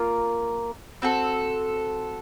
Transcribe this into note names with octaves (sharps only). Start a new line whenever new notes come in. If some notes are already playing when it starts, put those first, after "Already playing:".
Already playing: A#3 F4 A#4
C4 F#4 A4